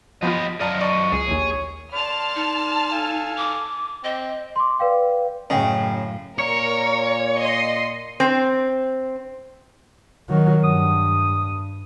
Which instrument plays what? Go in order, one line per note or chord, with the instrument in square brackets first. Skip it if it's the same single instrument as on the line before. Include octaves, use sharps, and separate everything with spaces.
[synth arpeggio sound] F3 B3 F4 [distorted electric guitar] G4 D#5 [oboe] B5
[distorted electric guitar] F#2 D#5 [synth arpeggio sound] D5 A5 A#5 [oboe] F5
[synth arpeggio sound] D5 A5 [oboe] C#6
[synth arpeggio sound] C#2 [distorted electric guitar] G#4
[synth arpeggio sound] A#1 D#2 [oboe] C#5
[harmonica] D5 C6 [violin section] A5 F6
[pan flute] D#4
[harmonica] A4 F5 G#5
[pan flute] D6
[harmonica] C4 [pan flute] D#5
[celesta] C6 D6
B4 D5 F5 G5
[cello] F#2 A2 [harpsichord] C#3 [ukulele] D#5 G5
[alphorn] A#2 [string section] A#4 [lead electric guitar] C#5 [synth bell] C#7
[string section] D#5 C6
[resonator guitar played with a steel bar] C4
[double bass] D#3 F#3
[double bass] G2 [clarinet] D#6